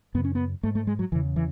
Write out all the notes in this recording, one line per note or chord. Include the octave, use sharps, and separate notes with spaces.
F#2 C#3 B3
C#4
B3
G#2 A3
A3
G#3
F#3
E2 C#3 E3
E3